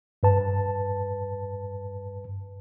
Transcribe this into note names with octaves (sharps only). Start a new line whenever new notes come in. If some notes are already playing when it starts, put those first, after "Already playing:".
G2 B4 A5